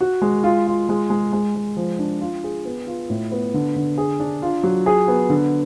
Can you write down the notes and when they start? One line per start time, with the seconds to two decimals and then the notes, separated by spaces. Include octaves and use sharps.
0.01 F#4
0.22 G#3
0.44 F4
0.67 F4
0.89 G#3
1.10 G#3
1.33 G#3
1.55 G#3
1.77 F3
1.99 D4
2.21 F4
2.44 G#4
2.65 B3
2.87 F4
3.10 A2
3.32 B3
3.54 D3
3.76 D3
3.98 G#4
4.20 D4
4.42 F4
4.63 F#3
4.86 G#4
5.08 B3
5.30 D3